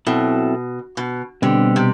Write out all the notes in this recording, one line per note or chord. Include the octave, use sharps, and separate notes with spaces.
B2 F#3 C4 E4 A4
B2
B2 D3 G3 C4 G4
C3